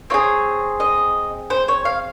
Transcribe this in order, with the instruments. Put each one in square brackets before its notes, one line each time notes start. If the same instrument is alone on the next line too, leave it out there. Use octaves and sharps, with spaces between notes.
[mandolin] C4 F4 C#5
G#4
D#5
C5
C#5
F5